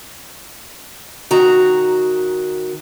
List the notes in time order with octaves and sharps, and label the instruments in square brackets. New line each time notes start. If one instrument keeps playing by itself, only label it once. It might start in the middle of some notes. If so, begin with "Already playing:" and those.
[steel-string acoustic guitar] D#3 F#4 A#5